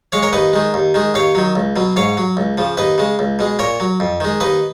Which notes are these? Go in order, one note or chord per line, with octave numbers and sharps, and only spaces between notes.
G#3 C#5 F5
A#4 C#5
D#2 B4 D#5
D#3 G#3
D#2
D#3 G#3
D#2 C#5 F5
D#3 F#3
C#2
B2 F#3
G#2 C#5 F5
F#3
C#2
C#3 F3
D#2 B4 D#5
C#3 G#3
C#2
B2 G#3
A#2 A#4 C#5
F#3
F2
D#3 G#3
D#2 B4 D#5